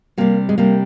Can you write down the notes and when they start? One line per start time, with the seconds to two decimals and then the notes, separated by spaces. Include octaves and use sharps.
0.18 C3 G3 A#3
0.49 G#3
0.58 C3 G3 A#3